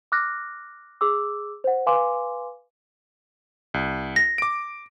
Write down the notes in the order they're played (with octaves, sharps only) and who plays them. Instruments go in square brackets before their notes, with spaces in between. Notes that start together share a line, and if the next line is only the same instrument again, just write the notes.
[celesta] D6 F6 F#6 A#6
G#4 D6 E6
C5 F#5
B4 F5 G#5 C6 D6
[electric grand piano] C2
[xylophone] A#6
[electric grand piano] D6 D7